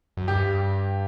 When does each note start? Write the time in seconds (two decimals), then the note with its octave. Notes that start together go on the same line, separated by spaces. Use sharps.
0.17 F#2
0.28 G2 G4